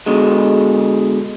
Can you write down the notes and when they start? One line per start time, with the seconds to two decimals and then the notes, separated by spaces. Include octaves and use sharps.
0.06 B2 D3 G#3